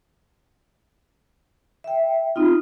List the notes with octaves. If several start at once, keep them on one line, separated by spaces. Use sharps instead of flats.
E5 G5
C4 D#4 F4